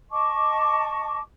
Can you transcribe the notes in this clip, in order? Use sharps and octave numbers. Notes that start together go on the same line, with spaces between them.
D#5 A5 C#6 D6